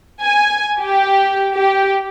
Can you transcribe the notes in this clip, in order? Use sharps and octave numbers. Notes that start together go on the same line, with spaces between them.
G#5
G4
G4